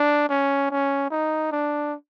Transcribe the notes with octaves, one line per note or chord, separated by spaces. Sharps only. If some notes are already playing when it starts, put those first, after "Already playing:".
Already playing: D4
C#4
C#4
D#4
D4